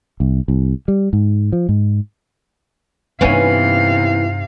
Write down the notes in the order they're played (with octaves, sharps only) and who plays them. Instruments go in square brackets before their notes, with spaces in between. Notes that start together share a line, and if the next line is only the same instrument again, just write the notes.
[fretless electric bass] C2
C2
G3
G#2
F3
G#2
[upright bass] G2 D#4 [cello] C3 F5 [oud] E3 B3 C#4